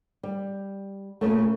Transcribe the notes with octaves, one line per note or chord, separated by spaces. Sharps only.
G3
A#2 C#3 A3